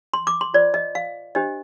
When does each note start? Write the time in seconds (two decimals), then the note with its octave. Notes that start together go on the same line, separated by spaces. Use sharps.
0.14 C6
0.27 D6
0.41 C6
0.54 F4 C5 D5
0.74 D#5
0.95 F5
1.35 D4 G4 C5 D#5